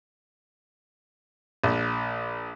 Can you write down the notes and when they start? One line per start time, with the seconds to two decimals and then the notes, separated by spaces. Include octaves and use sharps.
1.64 A#1